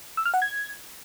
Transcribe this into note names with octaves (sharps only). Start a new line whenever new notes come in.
E6
F6
F#5
G#6